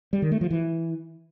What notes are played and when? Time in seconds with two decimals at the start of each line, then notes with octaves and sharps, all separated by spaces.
0.13 G3
0.22 D#3
0.32 A3
0.41 F3
0.50 E3